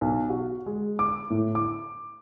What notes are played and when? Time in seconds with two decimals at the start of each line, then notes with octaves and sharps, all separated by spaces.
0.01 B1
0.30 F#4
0.66 G#3
0.99 D6
1.30 A2
1.55 D6